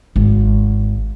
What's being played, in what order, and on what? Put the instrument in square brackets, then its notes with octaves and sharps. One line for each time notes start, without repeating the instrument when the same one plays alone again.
[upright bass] G#1